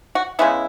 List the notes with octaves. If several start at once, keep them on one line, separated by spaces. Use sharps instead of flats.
F#4
C#3 G#3 B3 E4